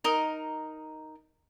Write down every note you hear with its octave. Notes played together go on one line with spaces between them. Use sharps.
D#4 A#4 D#5 A#5